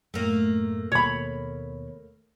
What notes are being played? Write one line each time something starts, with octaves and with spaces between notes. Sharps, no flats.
F#2 A2 A3 A#3
D#2 B2 C#5 B5